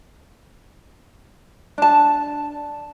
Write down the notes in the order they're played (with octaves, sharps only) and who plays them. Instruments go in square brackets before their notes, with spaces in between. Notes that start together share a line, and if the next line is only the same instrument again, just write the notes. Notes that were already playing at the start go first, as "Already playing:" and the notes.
[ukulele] D4 A5